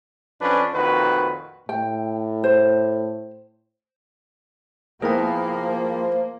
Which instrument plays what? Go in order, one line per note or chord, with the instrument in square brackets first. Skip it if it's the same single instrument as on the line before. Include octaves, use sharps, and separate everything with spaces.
[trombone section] F2 F3 C#4 D4 B4
F2 A#2 D#3 F#4 B4
[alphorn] A2 [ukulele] G5
[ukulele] C5
[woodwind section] F3 [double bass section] A#3 [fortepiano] B3 E4 A#4 [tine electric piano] G#4 G5